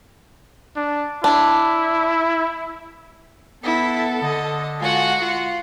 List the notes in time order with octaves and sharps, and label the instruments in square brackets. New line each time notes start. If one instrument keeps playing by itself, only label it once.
[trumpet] D4
[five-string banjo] D4 [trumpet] E4
[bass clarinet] B3 [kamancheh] E4 [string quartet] A4
[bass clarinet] D3 [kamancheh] D#5
[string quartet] G#3 F#4 F#5 [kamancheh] F4 G#5
[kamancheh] F4